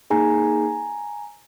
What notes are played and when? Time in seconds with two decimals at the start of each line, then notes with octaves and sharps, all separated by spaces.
0.10 A#3 D#4 G#4 G#5 A#5